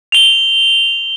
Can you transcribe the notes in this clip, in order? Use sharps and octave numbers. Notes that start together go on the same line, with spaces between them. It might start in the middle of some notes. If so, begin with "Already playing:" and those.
F7 G7